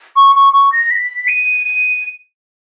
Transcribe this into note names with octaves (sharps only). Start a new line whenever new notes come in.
C#6
C#6
C#6
A#6
B6
D#7
D#7